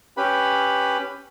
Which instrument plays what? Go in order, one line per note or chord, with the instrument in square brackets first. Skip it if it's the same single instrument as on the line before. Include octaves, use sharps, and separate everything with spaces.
[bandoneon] C#4 G4 B4 B5